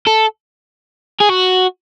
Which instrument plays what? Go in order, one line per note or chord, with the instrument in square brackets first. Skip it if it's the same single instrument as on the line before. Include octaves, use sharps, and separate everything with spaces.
[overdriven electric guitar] A4
G#4
F#4